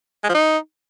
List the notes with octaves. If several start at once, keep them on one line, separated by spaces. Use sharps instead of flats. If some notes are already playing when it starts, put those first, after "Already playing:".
G#3
F3
D#4